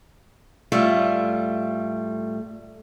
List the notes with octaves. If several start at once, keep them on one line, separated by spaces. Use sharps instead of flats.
A2 G3 A3 F4